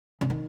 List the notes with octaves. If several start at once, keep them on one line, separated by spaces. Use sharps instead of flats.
C#3
D#3